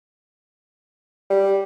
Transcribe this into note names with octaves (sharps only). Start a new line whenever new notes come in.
G3